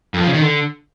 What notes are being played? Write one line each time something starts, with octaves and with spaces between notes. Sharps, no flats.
F2
F3
C#3
D#3
D3